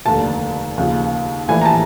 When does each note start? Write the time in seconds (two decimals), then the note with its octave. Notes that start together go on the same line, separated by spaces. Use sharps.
0.05 F1 D#2 D3 A5
0.77 D#2 C#3 F3
1.48 A#1 A2 E3 G#5
1.62 A#5
1.65 A5